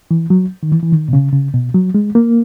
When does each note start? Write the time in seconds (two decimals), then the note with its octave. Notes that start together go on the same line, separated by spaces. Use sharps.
0.11 E3
0.30 F#3
0.63 D#3
0.72 E3
0.83 E3
0.92 D#3
1.09 B2
1.13 C#3
1.33 C#3
1.54 B2
1.74 F#3
1.95 G#3
2.15 A#3